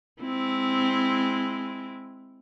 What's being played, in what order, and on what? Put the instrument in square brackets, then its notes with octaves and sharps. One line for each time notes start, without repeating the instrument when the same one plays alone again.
[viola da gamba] G#3 C4 E4